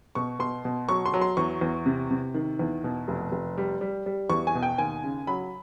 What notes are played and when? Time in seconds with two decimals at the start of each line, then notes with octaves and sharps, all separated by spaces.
0.15 B2 C#6
0.39 B2 C6
0.65 B2
0.89 F#3 C#6
1.06 C6
1.14 F#3
1.21 C6
1.37 E2 C#6
1.61 E2
1.86 C3
2.11 C3
2.34 D#3
2.59 E2
2.84 B2
3.08 F1
3.32 F1
3.58 G3
3.81 G3
4.06 G3
4.30 E2 C#6
4.47 G#5
4.55 B2
4.63 G5
4.78 D#2 G#5
5.04 C#3
5.27 F#3 B5